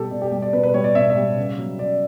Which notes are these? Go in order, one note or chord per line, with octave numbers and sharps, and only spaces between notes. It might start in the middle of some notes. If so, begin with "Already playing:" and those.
Already playing: B2 G3 G4 A4
B2 D5
G4
G3 G4
D5
B2 B4
B4
G3 C#5
D5
B2 E5
E5
G3
C#3
F#3
C#3 D5